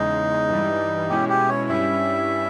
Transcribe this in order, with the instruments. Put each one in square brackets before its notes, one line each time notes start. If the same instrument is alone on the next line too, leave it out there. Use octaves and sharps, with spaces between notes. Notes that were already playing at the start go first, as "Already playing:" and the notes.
Already playing: [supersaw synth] E2 C#3 G#3 [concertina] D#4
[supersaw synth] G2 E3 G3
[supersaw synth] B2 G#3 C#4 E4 [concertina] G4
[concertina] G4
C#5
[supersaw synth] G2 G3 C#4 E4 [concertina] E5